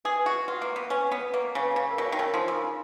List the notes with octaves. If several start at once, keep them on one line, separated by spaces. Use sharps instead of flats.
G#4 B4
B4
F#4
B4
F4 F#5
A#3 B4
B3 B4
C#4 B4
F#5
B3
B4
A#3 B4
B4
C#3
B4
C#3 F5
A#4
B2
C#5
D#3
C#3 A#4
F3 D#4
C#3 A#4
D#4